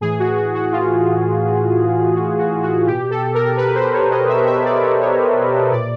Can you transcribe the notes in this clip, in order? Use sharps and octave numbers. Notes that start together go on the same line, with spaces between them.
A2 E3 G#4
F#4
F#4
F#4
F4
F#4
F#4
F#4
B2 G4
A4
A#4
B4
C5
C#5
D#5
E5
E5
D5
D5
C#5
C#5
A#2 D5